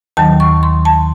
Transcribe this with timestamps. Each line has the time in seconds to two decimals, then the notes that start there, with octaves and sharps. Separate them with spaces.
0.17 D#2 D#3 F#3 A5
0.40 C#6
0.63 C6
0.85 A5